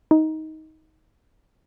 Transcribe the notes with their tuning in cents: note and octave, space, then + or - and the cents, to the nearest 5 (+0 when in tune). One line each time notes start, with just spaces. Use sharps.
D#4 +15